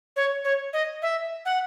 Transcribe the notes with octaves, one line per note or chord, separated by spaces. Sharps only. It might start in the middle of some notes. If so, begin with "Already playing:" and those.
C#5
C#5
D#5
E5
F#5